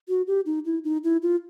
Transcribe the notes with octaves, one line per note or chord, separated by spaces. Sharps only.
F#4
G4
D#4
E4
D#4
E4
F4